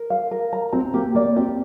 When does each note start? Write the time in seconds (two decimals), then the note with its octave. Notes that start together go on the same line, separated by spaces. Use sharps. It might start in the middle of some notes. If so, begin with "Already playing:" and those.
Already playing: A#4
0.10 F5
0.31 A#4
0.53 A#5
0.73 C4 A#5
0.94 A#3 G4
1.15 A#3 D5
1.36 C4 G4